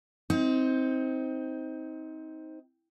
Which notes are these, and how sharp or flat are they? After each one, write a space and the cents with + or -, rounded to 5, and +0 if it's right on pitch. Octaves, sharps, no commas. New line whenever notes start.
C4 +0 D#4 +25